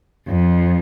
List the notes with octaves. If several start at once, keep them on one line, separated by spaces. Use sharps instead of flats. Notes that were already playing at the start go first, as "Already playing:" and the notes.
F2